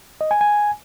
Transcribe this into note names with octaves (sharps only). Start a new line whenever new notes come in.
D#5
G#5
G#5